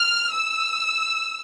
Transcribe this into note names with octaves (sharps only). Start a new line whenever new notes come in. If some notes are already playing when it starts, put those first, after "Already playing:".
Already playing: F6
E6